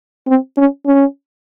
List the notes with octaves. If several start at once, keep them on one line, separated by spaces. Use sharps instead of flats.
C4
C#4
C#4